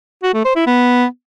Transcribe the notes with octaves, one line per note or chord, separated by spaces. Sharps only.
F#4
A3
C5
E4
B3